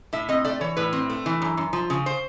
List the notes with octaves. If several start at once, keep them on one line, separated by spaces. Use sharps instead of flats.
A2 E5
C4 D#5
A3 D5
E3 C#5
A2 B4
C4
A3
E3
F#2
F#2
F3
C#3
C5